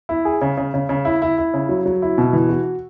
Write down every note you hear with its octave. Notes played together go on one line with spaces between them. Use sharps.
E4
G#4
C#3
C#3
C#3
C#3
E4
E4
E4
C#3
F#3
F#3
E4
B2
E3
F#4